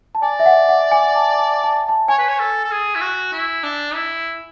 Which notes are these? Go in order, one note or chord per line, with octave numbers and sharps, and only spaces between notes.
A5
D5 G#5
E5
F#5
F#5
G#5
A5
A5
A5
A5
C#5 G#5
B4
C#5
A4
A4
G#4
E4
F#4
E4
D4
E4